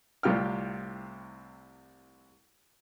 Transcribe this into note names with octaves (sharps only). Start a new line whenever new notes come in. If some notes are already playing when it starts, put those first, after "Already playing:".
C2 A2 C3 F4 G5 F6